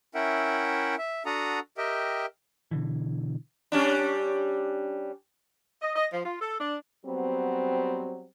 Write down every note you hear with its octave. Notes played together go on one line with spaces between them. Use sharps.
C#4 E4 A#4 E5 F#5 G5
E5
D4 F#4 A4 F#5 A#5 D#6
G4 A#4 D#5 E5 G5
B2 D3 E3
G3 C#4 D4
D#5
D#5
F3
F4
A4
D4
F#3 G3 B3 C4